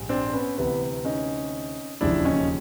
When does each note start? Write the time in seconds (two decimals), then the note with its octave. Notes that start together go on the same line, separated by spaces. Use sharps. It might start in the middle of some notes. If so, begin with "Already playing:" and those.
Already playing: A#1 G#2 G3
0.09 C4 D4
0.33 B3 C#4
0.57 D2 C3 E3 B3
1.05 C#4 D#4
2.01 E1 D#2 C#3 F3 D4 E4
2.25 C#4 D#4